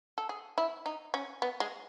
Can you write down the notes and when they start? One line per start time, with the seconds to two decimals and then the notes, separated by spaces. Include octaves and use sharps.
0.18 A4
0.29 G#4
0.58 E4
0.86 D#4
1.14 C#4
1.42 B3
1.60 G#3